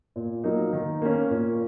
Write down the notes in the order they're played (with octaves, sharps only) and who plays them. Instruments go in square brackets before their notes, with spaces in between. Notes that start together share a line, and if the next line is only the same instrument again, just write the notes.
[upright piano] A#2
F#3 A#3 D#4
D#3
A#3 C#4
A#2